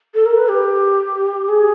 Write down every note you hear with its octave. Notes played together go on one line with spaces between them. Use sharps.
A4
A#4
B4
G4
G#4